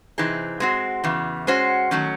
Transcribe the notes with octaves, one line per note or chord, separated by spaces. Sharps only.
C3 E3 C4 D#4 G#4
G#3 C4 F#4
E2 C#3 E3
G#3 C#4 F#4 C5
D#3 F#3 A3 C#4